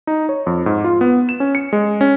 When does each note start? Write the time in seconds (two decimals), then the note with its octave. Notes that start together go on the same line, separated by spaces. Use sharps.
0.07 D#4
0.29 C#5
0.47 F2
0.66 G#2
0.84 F4
1.01 B3
1.29 E7
1.40 C#4
1.55 C#7
1.73 G#3
2.01 C#4